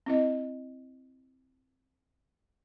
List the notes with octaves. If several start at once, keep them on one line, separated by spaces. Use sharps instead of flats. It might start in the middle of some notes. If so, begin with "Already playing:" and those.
C4 E4 D#5